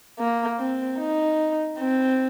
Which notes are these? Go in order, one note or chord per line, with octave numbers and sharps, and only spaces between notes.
A#3
C4
D#4
C4